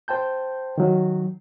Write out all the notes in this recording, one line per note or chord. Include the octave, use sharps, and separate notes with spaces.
C5 G5 A5 G6
D#3 F#3